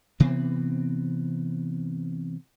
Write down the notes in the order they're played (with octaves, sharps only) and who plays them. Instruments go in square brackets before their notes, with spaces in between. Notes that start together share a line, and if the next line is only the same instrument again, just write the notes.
[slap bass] C3 E3 B3 C4